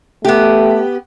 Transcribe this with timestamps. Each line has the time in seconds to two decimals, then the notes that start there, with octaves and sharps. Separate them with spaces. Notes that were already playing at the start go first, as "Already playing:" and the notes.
0.25 A3 B3 G4